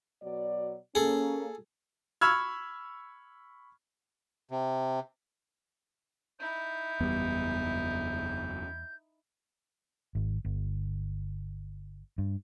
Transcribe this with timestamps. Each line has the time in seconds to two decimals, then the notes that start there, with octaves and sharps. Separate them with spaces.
0.22 B2 F#3 D5
0.95 A#3 C#4 G#4 A4
2.21 B5 C#6 E6 F6 G#6
4.51 C3
6.40 D#4 E4 G6
7.00 F#1 E2 G3 B3
10.15 G#1
10.45 G1
12.18 G2